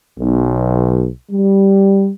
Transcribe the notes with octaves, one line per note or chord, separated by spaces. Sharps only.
B1
G3